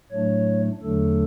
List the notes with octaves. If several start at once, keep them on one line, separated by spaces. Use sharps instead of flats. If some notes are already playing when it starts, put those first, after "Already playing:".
A2 F#3 A3 D4 C#5
E2 D3 F#3 A3 D4 A4